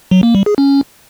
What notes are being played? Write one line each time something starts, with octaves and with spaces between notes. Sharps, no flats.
F#3
A#3
G3
G#4
C#4